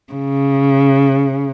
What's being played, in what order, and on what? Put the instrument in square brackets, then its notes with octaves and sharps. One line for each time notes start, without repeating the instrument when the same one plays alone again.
[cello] C#3